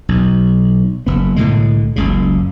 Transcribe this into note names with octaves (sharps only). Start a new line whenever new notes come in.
B1
F#1 B3
C2 A2 D3 G#3
F#1 C#2 C#3